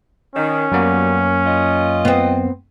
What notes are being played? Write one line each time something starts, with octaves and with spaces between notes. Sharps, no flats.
D#3 C#4
F#2 F#3 G3 A#3 B3
F4 D#5
B3 C4